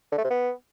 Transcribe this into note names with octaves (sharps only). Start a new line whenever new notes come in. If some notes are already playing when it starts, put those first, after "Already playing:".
D3
A3
C3
B3